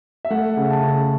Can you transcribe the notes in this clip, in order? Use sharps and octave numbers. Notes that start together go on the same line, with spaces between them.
E5
A3 F#5
C#3
A5
C#3